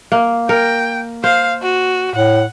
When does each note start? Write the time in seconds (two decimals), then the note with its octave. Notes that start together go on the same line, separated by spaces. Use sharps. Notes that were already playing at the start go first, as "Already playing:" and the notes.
0.12 A#3
0.49 A#4 G5
1.24 C5 F5
1.62 F#4
2.16 A2 F#5